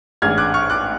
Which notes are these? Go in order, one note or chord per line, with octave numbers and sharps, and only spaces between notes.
A1 G#2 G#3 D4 F6 G#6
D6 F#6
C#6 F6
D6 F#6